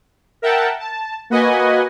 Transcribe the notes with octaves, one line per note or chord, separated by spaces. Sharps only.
A#4 E5 F#5 G5 A5
A5
A#3 F#4 B4 D#5 F#5 G#5